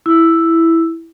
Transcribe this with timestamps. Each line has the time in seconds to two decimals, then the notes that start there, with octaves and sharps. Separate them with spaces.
0.06 E4